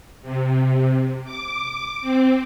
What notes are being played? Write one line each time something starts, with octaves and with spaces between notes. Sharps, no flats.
C3
D6
C4